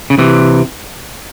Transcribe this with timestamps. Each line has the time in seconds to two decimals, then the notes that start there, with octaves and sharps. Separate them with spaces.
0.10 C#3
0.19 C3 E3